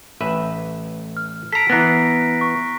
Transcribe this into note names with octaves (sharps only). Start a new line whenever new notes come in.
A1 B4 E5
F6
A4 A#5 B6 C7 D7
E3 B3 A#5 F#6 A#6
C#6